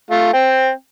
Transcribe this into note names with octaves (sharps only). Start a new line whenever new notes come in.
A3 F4
C4 G5